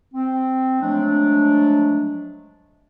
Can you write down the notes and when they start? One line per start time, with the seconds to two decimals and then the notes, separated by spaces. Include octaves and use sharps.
0.13 C4
0.81 F3 F#3 G#3 A3 D4